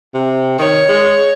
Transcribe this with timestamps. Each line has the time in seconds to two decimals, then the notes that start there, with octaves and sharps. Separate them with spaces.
0.14 C3
0.59 D#3 C#5
0.89 G#3